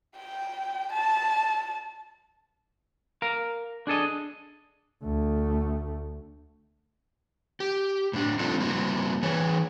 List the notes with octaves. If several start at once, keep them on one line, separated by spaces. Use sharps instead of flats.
G5
A5
A#4 F5
D4 G#4 A4 D#5
D2 A3
G4
A2 D4
A3 C4 D4 D#4 F4 A4
A#3 C4 E4 F#4
E3 G#4 C#5